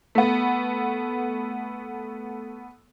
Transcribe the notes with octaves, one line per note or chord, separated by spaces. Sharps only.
A3 B3